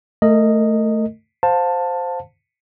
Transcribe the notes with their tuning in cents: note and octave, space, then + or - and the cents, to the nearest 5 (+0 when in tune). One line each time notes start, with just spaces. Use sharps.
A3 +0 A#4 -35 D#5 +0
C5 -5 F5 +25 A5 +10